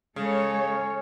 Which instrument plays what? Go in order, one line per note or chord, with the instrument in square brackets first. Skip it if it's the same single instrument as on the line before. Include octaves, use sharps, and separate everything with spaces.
[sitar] C#3 [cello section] G#3 A4 C#5